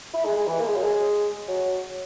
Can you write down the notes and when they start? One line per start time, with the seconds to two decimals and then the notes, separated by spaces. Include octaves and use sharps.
0.14 E4
0.25 G#3
0.36 G#3
0.47 E3
0.59 A#3
0.67 G#3
0.76 F#3
0.83 G#3
1.48 F#3